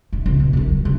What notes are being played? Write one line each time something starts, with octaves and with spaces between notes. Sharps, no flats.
D#3
C#2
B2
D3 D#3
F#3
D3